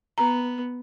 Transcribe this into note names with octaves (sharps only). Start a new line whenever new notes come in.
B3 A#5